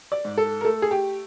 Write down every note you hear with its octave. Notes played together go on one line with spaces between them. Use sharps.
D5
G#2
A4
A#4
A3 A4
G#4
G4